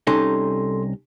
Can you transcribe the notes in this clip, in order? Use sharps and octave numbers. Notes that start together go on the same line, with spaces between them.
C2 C#4 D#4 A4 C6